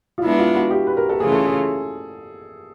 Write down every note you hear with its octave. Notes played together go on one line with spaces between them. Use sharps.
F4
G#3 B3 D4 E4
F4
F#4
G4
B4
A#4
A4
C#3 E3 A3 C#4 F4 G#4
A4
G#4